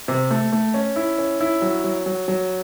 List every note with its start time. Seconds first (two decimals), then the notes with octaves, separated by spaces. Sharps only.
0.08 C3
0.31 A3
0.53 A3
0.74 C#4
0.96 E4
1.18 C#4
1.41 E4
1.62 F#3
1.84 F#3
2.06 F#3
2.28 F#3